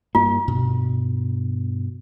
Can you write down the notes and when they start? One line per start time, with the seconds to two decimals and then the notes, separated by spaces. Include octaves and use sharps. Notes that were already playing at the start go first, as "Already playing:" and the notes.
0.15 G2 A#3 F4
0.48 G2 B2